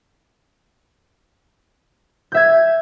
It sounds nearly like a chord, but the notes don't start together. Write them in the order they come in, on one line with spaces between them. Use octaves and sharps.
G6 E5 G#6